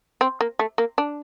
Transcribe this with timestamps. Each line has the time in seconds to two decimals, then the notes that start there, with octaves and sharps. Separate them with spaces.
0.21 C4
0.41 A#3
0.59 A3
0.78 A#3
0.98 D4